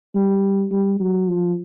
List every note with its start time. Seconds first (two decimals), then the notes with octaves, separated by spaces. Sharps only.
0.15 G3
0.72 G3
1.00 F#3
1.28 F3